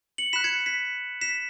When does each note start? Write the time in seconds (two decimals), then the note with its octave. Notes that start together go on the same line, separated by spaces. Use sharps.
0.18 C#7 F#7
0.33 B5 F#6 B6 E7
0.44 G#6 C#7
0.66 B6
1.21 B6 E7